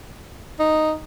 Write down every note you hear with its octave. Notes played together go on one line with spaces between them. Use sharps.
D#4